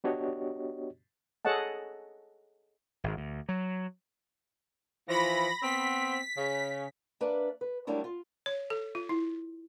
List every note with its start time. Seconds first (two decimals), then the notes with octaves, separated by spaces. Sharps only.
0.04 B3 D4 F#4 G4 C#5 D#5
1.45 G#4 A4 C#5 D#5 F#5 A5
3.04 G#1
3.17 D2
3.49 F#3
5.08 E3 F3 B5 A#6
5.62 B3 C4 B6
6.37 C#3
7.21 A#3 D4 B4 D5 E5
7.61 B4
7.87 F#3 G3 A3 A#3 D4 E4
8.04 F4
8.46 C#5
8.70 A4
8.95 F4
9.09 E4